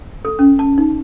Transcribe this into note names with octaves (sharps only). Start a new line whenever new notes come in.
A4
C#4
A5
D#4